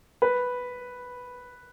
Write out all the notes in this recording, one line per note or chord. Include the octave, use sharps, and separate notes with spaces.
B4